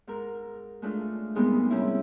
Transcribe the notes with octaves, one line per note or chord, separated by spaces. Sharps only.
G#2 A#4
G#3 A3 D4 F4
A#2 G3 G#3 B3 C4 D#4
C3 G3 C#4 E4